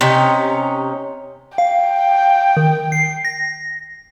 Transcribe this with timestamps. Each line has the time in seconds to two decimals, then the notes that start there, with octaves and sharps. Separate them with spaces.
0.01 C3 C#4 D#4
1.58 F5 G5
2.57 D#3
2.92 C7
3.25 A#6